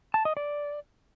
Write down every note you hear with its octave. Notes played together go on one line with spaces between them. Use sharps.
A5
D#5
D5